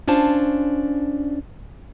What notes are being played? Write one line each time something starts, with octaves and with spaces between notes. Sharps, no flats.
C#4 D4 F4 C5 A5